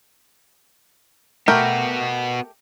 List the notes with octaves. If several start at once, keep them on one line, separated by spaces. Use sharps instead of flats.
A3 B3 F#4 G4 A#4